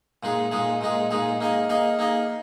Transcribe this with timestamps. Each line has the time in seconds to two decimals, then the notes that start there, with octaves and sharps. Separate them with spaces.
0.23 A#2 G#3 D#4 G#4
0.52 A#2 G#3 D#4 G#4
0.81 A#2 G#3 D#4 G#4
1.11 A#2 G#3 D#4 G#4
1.41 A#3 D#4 G#4 D#5
1.70 A#3 D#4 G#4 D#5
1.99 A#3 D#4 G#4 D#5